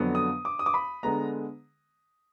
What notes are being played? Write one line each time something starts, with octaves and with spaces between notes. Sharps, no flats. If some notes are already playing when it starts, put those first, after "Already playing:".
Already playing: F2 D3 F#3 B3
D#6
D6
D#6
D6
B5
D3 G#3 B3 A#5